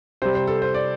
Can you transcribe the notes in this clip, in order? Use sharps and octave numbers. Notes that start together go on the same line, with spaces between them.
C3 G3 C5
C5
A4
C5
D5